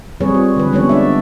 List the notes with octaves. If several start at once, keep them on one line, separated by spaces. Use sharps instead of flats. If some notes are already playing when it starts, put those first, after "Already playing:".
G3 C4 G#4 B4 C#5
F4
D3 G3 B4
G3 G#3 B3 C#4 A4 C#5
D4 D5 E5